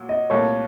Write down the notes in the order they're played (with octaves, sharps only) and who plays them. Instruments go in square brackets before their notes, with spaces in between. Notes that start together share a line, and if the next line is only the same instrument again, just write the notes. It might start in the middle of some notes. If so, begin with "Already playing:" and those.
Already playing: [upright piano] A#2 F#3
[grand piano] D#5
[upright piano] C2 A#2 A3 [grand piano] C#5